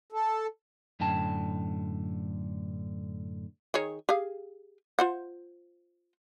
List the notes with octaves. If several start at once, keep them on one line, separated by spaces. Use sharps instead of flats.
A4
F#2 A2 D3 G5 A5
D#3 G#4 C#5
G4 G#4 F5
F4 C5 F#5